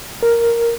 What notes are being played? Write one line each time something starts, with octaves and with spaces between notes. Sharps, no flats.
A#4